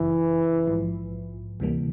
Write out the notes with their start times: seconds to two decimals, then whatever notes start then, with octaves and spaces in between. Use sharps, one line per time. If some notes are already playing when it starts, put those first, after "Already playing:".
Already playing: G1 F#2 C#3 E3
0.67 A#1 G#2 F3
1.60 D2 C3 E3 G3 A#3